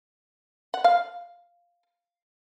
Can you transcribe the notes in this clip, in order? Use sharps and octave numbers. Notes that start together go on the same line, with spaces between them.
F#5
F5